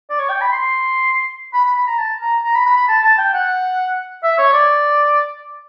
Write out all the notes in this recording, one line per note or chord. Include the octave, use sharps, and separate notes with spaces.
D5
C#5
G5
B5
C6
B5
B5
B5
A#5
A5
A#5
A#5
B5
B5
B5
A5
A5
G5
F#5
E5
C#5
D5